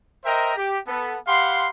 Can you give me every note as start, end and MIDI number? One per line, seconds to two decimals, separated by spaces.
0.25 0.55 70
0.25 0.55 72
0.25 0.55 75
0.25 0.55 76
0.25 0.55 79
0.25 0.55 82
0.56 0.78 67
0.87 1.17 59
0.87 1.17 69
1.27 1.69 67
1.27 1.69 77
1.27 1.69 78
1.27 1.69 83
1.27 1.69 84